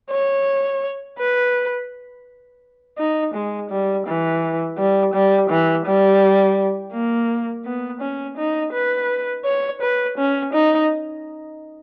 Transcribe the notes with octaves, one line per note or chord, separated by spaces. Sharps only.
C#5
B4
D#4
G#3
G3
E3
G3
G3
E3
G3
A#3
B3
C#4
D#4
B4
C#5
B4
C#4
D#4